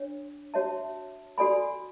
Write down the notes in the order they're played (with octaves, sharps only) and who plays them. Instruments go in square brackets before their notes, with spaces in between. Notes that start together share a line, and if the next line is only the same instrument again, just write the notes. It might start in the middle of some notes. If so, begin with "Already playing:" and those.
Already playing: [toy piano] D4 C#5
F#4 C#5 E5 A5
F#4 A4 D5 G#5 B5